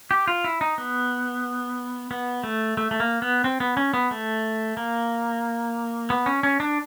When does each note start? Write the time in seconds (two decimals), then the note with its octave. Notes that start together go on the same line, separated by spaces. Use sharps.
0.11 G4
0.28 F4
0.44 E4
0.61 D#4
0.78 B3
2.11 B3
2.44 A3
2.77 A3
2.91 A3
3.00 A#3
3.22 B3
3.44 C4
3.60 B3
3.77 C#4
3.94 B3
4.11 A3
4.77 A#3
6.10 B3
6.26 C#4
6.43 C#4
6.60 D4